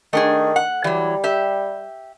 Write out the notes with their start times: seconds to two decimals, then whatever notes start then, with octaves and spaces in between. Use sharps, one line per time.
0.13 D#3 A3 D4 G#4
0.56 F#5
0.84 E3 F#3 G3
1.24 G4 E5